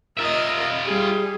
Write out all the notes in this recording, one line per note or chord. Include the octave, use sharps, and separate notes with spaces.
F4 A#4 D#5 E5
G3 G#4